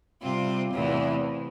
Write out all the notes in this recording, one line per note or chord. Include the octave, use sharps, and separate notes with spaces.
C3 G3 C4 F4
E2 C3 E3 A3